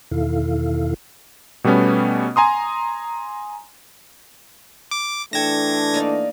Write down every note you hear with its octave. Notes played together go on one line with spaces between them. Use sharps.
E2 B2 D#3 E4 A4 F5
B2 G3 A3 B3 C#4
G#5 A#5 C6 D#6
D6
E3 A3 D4 A4 G5 A5 G#6 A#6
A#3 D#4 D5